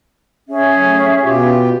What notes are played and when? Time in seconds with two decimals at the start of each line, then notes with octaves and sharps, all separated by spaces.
0.49 C#4 G#4 E5
0.74 A2 F#3
1.23 B2 F4 G4